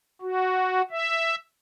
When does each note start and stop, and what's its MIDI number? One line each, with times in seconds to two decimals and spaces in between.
0.21 0.82 66
0.90 1.35 76